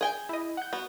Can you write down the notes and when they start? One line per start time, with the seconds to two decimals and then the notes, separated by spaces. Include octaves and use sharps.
0.01 G#4 G5 G#5
0.29 E4 D#5
0.57 F#5 G6
0.73 B3 F#4